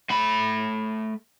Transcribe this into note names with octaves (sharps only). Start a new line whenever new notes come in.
A3 B5